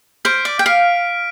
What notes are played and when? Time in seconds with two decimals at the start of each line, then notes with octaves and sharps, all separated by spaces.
0.25 C5 F6 B6 D7
0.45 D5
0.59 G5
0.66 F5 F6 B6 D7